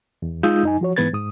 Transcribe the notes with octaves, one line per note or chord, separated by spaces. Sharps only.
E2
G#3 D#4 F4 D#6 E6 G6
F#2 D#4 G#5
F3 F#4 C#5
G#2 E3 B3 B4 G#6 A6
G#2 D#6